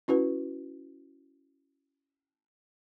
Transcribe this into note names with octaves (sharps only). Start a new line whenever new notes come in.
C#4 E4 F#4 B4